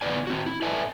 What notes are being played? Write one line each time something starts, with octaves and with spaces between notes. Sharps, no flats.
C#3 B3 E4 B4 D5 G#5
C4 F#4
E4
A4 B4 D5 E5 G#5 A5